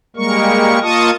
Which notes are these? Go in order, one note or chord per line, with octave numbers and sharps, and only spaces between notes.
G3 G#3 A#3 A#4 C#6
A#3 F4 D#5 A5 C#6 D#6